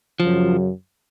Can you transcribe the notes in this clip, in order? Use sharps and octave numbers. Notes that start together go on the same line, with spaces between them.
F#2 C#3 F3 F#3